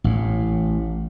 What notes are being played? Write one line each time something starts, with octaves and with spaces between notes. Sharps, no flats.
A1 A2